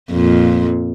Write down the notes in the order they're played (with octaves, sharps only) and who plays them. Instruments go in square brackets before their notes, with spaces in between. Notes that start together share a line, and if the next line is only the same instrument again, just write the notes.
[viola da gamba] F2 A#2